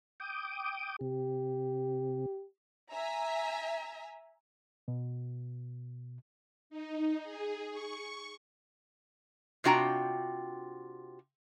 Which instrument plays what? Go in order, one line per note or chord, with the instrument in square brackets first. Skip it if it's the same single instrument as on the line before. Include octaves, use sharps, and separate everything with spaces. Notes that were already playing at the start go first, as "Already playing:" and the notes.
[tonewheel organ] G5 D6 D#6
[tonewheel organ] C3 [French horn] G4
[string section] E5 G#5 A#5
[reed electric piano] B2
[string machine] D#4
G#4
C#6
[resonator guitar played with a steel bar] C3 D4 F4 F#4 G5 A#5